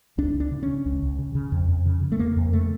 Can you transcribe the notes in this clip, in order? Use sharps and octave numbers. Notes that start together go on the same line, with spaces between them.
C#2 D4
C#2
D4
C#3
C#3 C#4
C#2
C#2
C#3
C#3
F2
F2
C#3
C#3
A3
F2 A#3
F2
C#3 A3